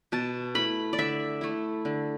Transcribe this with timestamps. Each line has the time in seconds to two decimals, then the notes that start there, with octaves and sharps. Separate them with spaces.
0.12 B2 A5
0.55 A3 E4 B5
0.93 D5
0.98 D3 E5
1.41 A3 E4
1.85 D3